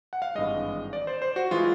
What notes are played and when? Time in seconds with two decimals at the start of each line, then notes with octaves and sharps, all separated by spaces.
0.13 F#5
0.22 F5
0.35 G#1 G2 E3 G#3 D#5
0.93 D5
1.07 C5
1.22 C5
1.36 F#4
1.51 E3 G#3 F4